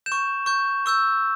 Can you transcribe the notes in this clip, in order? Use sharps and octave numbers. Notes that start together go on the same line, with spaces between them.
G6 E7
C#6
C#6 G6
C#6 E6 G6